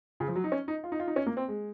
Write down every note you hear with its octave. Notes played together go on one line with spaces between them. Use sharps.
C#3
F3
F#3
D#4
C#4
D#4
F4
D#4
F4
D#4
C#4
A#3
C4
G#3